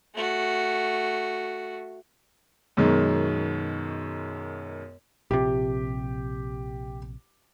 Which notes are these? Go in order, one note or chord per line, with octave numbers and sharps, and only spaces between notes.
A3 F#4
F#2 B2 D#3 G#3
A#1 C3 G4